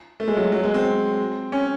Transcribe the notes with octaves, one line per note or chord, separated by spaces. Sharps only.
A3
G#3
F#3
F#3
G#3
C4
C#4